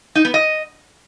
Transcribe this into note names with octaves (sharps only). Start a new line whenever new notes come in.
D#4
B3
D#5